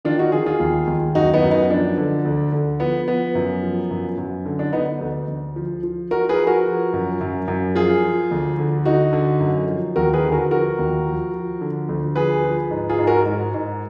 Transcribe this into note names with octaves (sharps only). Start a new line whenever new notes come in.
D#3 D4 F4
D#4 F#4
D#3 F4 G#4
F4 G#4
D#2
D#2
F#2 D#4 F#4
B3 D#4
F#2
B3 D#4
F3 D4
D3
D2
D3
F3 B3
F3 B3
F#2
F3
F#2
F#2
D3
D4
D3 B3 D#4
D2
D2
F3
F3
F3 F#4 A#4
G#4 B4
F3
F#4 A#4
F3
F#2
F#2
F#2
F3 F4 G#4
F3
D2
D3
D3 D#4 F#4
D3
F#2
F3
D#2 F#4 A#4
G#4 B4
D3
F#4 A#4
F3 F#4 A#4
D#2
F3
F3
D3
D2
F3 G#4 B4
F3
G#2
F4 G#4
G#2
F#4 A#4
G#2
G#2